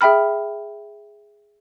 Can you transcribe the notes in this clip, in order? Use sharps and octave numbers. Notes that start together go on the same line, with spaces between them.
G#4 E5 G5 B5 F6